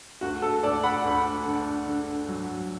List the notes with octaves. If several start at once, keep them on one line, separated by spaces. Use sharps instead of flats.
D2 F#4
A4
D2 A4 D5
F#5 B5
D2
D3
D3
F#3